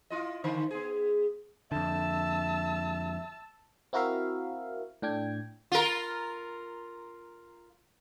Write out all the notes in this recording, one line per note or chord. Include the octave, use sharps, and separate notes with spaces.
E4 F4 D#5
D3 D#3 C5
B3 G#4
F2 D3 E5 A5 E6
C4 E4 F#4 A#4 E5 F5
A2 D4 G5 G#6
F4 A#4